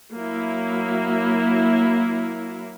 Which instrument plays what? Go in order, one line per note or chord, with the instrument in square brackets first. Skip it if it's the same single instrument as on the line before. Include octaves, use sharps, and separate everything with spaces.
[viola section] F#3 A#3 E4